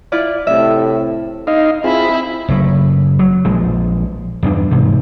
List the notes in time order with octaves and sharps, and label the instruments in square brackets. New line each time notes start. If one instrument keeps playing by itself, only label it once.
[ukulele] E4 F4 D5
[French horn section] A2 C3 [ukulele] E5
[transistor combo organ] D#4 D#5 F5
[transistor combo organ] C4 F4 G#4 [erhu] E4
[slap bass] F#1 A2
F#3
A#1 F3 G#3
E2 G2 B2 D4
E1 G#2 C3